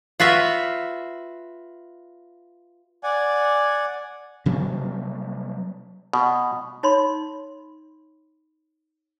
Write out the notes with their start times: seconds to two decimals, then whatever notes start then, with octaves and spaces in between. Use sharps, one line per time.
0.20 F4 F#4 B4 E5
3.03 D5 F#5 G#5
4.46 C3 F#3 G3 A#3
6.13 B2
6.83 D#4 C#5 B5 C6